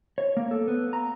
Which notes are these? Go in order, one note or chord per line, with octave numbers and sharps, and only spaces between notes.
C#5
A#3
A4
B3
A#5